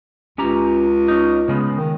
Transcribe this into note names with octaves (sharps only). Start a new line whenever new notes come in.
C#2 C#4 G4 A#5
C#4 D#4
C#3 G#3 B3
D#3